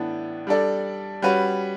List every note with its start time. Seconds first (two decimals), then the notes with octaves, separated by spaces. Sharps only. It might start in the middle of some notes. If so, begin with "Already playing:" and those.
Already playing: A2 E3 B3 D4
0.47 G3 D4 A4 D5
1.22 G3 C#4 F#4 B4